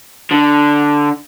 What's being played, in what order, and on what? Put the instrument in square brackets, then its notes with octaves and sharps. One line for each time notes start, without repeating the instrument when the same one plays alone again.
[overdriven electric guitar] D3